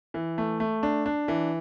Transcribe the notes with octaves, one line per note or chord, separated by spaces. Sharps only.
E3
A3
A3
D4
D4
E3